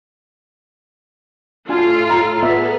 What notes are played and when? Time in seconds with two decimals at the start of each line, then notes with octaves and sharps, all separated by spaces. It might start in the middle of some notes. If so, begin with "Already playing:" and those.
1.69 A2 D4 F4 F#4 A4 G#5 F6
2.10 A#5
2.43 B3 G#4 A4 B4 D5 E5